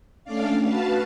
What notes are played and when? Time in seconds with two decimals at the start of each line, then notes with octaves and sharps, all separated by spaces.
0.24 A3 C#4 D4 D5 F5
0.61 F#4 B4 F5 A5